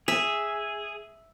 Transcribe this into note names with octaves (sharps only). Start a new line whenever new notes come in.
G#4 E5